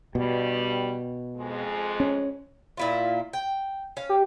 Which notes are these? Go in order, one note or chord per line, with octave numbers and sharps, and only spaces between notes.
G2 B2 G3
F2 G#3
C#4
A#2 E4 F4
G5
C#4 F5
G4